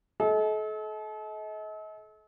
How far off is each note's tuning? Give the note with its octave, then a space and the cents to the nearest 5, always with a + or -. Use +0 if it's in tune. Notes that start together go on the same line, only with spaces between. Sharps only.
A4 -40 D#5 +40